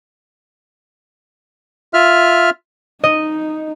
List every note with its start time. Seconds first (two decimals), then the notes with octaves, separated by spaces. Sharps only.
1.94 F4 E5 F6
3.04 D#4 D#5